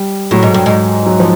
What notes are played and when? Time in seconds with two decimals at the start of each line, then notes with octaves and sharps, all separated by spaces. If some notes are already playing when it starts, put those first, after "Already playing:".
Already playing: G3
0.31 A2 F#3
0.43 G#2
0.54 G2
0.66 G#2
1.06 F#3
1.20 F3